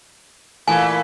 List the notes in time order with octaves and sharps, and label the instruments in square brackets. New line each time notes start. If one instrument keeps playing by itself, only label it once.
[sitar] A#2 E3 A3 [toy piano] G#5